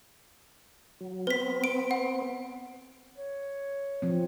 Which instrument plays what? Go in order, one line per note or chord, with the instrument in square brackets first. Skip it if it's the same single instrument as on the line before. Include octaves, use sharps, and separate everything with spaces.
[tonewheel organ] F#3
[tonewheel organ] B3 C4 [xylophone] B4 B6
[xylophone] D7
F#5
[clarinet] C#5
[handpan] F3 C4